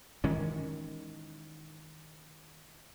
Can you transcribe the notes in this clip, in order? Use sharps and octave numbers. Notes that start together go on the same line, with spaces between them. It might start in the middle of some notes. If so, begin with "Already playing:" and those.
D#3 E3 G#3 C#4